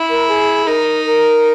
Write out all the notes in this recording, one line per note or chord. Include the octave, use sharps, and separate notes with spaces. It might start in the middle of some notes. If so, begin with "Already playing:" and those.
Already playing: E4
A#4
G#4
D#4 A#4
A#4